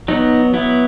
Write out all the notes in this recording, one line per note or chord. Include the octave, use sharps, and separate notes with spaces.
F#3 B3 D#4
F#3 B3 E4